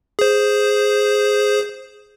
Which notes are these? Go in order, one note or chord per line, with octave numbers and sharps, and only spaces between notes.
G#4 C5